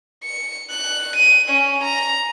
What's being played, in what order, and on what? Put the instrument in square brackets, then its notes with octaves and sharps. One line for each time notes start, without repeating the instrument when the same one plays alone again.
[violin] C#7
F#6
D#7
C#4
A#5